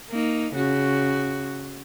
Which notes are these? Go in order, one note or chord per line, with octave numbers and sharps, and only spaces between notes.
A#3 D#4
C#3 F#4